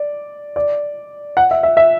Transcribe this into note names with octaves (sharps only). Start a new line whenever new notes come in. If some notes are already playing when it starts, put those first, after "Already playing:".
Already playing: D5
D5
F#5
E5
E5
E5